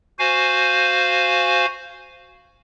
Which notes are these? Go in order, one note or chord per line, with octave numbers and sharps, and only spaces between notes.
F#4 C5 F5 G#5